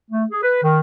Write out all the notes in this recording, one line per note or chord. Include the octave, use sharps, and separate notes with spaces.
A3
G#4
B4
D#3